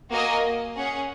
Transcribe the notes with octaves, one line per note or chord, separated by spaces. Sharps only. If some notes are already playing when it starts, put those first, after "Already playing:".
A#3 F#4 D#5 G#5
C#4 G#4 F#5